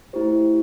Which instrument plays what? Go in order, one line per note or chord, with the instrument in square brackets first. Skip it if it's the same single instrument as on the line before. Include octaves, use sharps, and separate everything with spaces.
[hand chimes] A3 E4 G4 C5